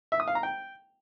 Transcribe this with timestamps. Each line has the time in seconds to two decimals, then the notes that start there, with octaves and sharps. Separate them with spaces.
0.12 E5
0.20 D#6
0.28 F5
0.35 A#5
0.43 G5